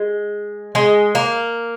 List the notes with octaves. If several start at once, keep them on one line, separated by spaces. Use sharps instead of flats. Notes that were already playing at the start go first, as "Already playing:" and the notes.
Already playing: G#3
G#3
A#3